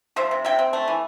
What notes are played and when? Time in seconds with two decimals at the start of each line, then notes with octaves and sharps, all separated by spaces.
0.16 F3 C5 E5
0.31 C3
0.45 C3 E5 G5
0.59 C4
0.73 A3
0.88 E3